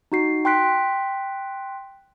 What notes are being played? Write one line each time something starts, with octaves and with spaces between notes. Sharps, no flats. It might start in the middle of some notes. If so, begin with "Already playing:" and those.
D#4 F#4 C7
G5 C6 F#6 B6 D7